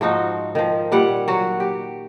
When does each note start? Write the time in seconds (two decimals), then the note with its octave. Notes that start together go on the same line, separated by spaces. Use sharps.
0.01 G#2 F3 D#4 F#4
0.55 D#3 F3
0.92 A#2 G3 F#5
1.28 F#3 F#4
1.60 G4